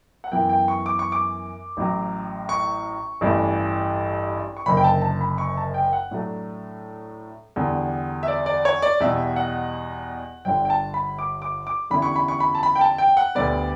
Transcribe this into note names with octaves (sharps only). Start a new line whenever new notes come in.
F#5
F#2 E3 B3 E4 G5
G5
C#6
D6
C#6
D6
A1 A2 F#3
C#6
A1 G2 E3 A3
C#6
F#1 F#2 D3 B5
G5
A5
A5
B5
C#6
A5
G5
F#5
A2 F#3 A3 D4
E2 D3 G3
E5
D5
D5
C#5
D5
E2 B2 G3 E5
F#5
G1 G2 D3 G5
G5
A5
B5
D6
D6
D6
E2 D3 G3 C#4 E4 B5
C#6
B5
C#6
B5
A5
B5
G5
A5
G5
F#5
D2 D3 G3 B3 D5